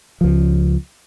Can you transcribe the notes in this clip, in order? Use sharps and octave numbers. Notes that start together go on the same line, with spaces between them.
C#2 F3